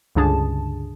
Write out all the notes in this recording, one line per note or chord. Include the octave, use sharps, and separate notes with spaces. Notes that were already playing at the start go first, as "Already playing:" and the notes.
C#2 G2 D3 D4 G#4 A5